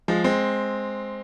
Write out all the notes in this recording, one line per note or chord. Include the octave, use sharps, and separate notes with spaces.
F3 G#3
G#3 C4